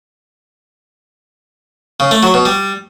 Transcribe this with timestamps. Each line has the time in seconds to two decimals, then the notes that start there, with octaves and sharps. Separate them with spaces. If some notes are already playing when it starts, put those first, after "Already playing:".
2.00 C#3
2.11 A3
2.23 F#3
2.34 B2
2.45 G3